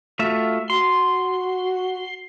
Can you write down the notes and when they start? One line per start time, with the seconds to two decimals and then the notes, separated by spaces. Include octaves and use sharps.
0.19 A3 F4 F#4 E5
0.70 F#4 C6